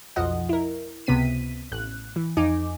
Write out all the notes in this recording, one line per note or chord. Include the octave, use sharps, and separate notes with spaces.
B1 F2 F3 D#5 F#5
E4 A#4
C#2 C3 B3 B6 D#7
A1 F#6
E3
F2 D#4 G#5 D6